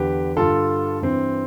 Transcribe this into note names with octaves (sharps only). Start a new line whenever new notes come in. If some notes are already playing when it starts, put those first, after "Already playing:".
Already playing: E2 D3 G4 B4
G2 D3 F4 A4
G2 E3 C4